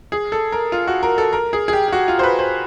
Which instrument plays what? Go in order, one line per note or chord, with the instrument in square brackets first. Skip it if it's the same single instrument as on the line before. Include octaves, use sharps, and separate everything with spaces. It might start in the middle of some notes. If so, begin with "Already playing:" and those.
[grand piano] G#4
A4
A#4
F4
F#4
A#4
A4
A#4
G#4
G#4
G4
G4
F#4
F4
C5
B4
C5